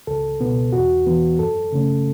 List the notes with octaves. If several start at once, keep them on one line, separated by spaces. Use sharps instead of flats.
C#2 A4
B2 B3
E2 F#4
E3 B3
F#2 A4
C#3 A3 C#4